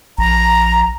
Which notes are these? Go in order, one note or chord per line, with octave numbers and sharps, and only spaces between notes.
A#1 A#5